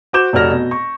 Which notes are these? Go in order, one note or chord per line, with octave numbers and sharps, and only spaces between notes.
F#4 C5 D6 G6 E7
F1 F#4 C#5 D5 F6 A#6
B2
C#6